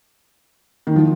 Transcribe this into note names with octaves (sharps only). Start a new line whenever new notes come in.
D#3
F3